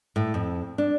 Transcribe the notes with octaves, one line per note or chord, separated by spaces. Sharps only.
A2
F2
D4